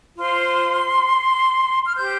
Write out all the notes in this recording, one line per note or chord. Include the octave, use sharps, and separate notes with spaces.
F4 C5 C6
F6
G4 C5 G6